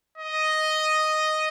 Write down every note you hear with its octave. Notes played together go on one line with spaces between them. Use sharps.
D#5